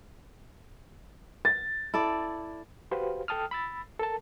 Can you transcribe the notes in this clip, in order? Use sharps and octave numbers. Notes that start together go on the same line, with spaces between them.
A6
E4 A4 D5
F#4 G4 B4 C5 F5
A4 G5 A5 D#6 F6
B5 E6 A6
A4 A#4 A5